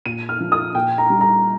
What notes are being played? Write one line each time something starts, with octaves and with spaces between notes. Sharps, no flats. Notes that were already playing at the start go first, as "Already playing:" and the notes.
A#2 D#7
F6
F3
D#6
A#2 G5
A#5
G3
A#5